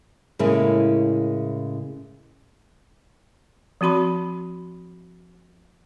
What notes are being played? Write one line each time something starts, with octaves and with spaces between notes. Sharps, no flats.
A2 C#3 G#3 A#3 E4
F3 C4 F#4 B5 C6